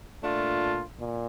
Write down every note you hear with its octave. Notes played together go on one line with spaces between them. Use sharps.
A#2 A3 D4 F4
A#2